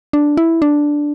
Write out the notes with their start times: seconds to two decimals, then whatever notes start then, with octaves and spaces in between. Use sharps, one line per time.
0.13 D4
0.37 E4
0.62 D4